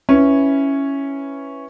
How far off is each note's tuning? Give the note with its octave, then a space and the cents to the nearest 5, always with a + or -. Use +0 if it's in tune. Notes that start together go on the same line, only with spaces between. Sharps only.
C#4 +0 E4 +0 B4 +0